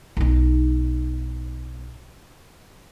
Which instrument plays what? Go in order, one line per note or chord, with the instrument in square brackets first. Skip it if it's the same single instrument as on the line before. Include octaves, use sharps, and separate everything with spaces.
[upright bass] B1 D#4